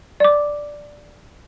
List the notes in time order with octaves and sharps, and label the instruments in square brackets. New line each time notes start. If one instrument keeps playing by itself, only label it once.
[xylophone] D5 D6